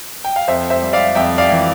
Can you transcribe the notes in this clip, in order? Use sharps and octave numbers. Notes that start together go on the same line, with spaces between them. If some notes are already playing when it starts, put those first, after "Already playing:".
G5
F5
F2 C5 E5
C5 E5
G3
D5 F5
F2 E5 G5
D5 F5
E3